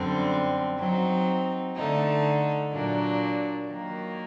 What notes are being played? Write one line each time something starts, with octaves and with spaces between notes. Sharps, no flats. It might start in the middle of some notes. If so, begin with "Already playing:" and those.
Already playing: F#2 D3 G3 C4
F#3 C4 D#4
D3 A3 D#4
A#2 F#3 A#3 D4
D#3 F#3 A#3